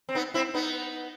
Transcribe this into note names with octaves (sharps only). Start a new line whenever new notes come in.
C4
B3 D#4
C4 E4
B3 D#4